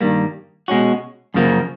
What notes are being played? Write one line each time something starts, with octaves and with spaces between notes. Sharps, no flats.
G2 D#3 G3 A#3
B2 G#3 C#4 F#4
F#2 C#3 F3 A#3